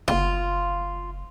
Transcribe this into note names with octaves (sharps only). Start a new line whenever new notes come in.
F#1 F4